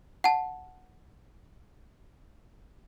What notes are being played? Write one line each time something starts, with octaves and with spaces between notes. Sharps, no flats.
F#5 A5